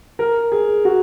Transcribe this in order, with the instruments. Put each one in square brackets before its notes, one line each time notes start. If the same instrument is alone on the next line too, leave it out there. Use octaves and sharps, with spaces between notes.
[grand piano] A#4
G#4
F#4